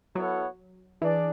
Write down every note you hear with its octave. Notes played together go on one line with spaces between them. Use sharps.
F#3 B3 E4 A4 C#5 F#5
E3 D4 G#4 D5